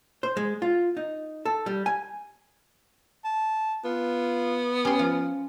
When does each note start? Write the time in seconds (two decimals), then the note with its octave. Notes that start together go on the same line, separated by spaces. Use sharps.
0.23 C5
0.37 G#3
0.62 F4
0.97 D#4
1.45 A4
1.66 G3
1.86 G#5
3.24 A5
3.84 B3 F4
4.85 C#4 G4 C6
4.99 F3 F4